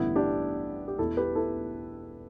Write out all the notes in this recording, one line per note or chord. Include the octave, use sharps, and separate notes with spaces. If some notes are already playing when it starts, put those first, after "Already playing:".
Already playing: A1 G2 D3 B3 E4
D4 G4
G4
E1 E2 B2 E4 A4
G4 B4
E4 A4